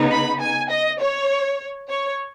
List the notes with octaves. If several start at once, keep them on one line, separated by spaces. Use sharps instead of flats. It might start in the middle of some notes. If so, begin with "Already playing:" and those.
Already playing: C#3 B3 D#4
B5
G#5
D#5
C#5
C#5